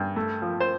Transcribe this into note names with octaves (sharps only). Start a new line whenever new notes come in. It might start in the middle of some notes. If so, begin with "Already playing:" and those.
Already playing: G2
A3
F3
C5